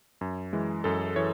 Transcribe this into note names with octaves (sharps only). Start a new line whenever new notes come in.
F#2
E3 G#3
F#2 A4
E3 C#5